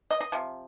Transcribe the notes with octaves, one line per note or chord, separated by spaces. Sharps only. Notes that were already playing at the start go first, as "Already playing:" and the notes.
D#5
D#5
C3 F3